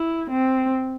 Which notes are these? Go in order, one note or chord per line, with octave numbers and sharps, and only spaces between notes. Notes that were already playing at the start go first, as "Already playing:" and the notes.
Already playing: E4
C4